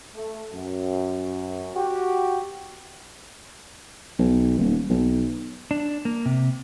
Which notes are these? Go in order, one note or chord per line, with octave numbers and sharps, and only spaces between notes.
A3
F#2
F#4 G4
B1
D#1
B1
D4
A#3
C3